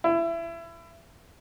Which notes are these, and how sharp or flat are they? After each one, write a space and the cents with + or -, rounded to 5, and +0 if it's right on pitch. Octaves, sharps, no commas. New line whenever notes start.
E4 +25